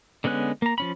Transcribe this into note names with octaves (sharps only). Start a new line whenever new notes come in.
D3 G#3 B3 C#4 F#6
A#3 A#5
F3 C#4 B5